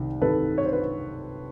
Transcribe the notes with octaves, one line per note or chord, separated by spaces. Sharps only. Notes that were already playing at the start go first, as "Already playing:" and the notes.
Already playing: C2 C3 D#3
C2 C3 D#3 A4 B4
C#5
C5
B4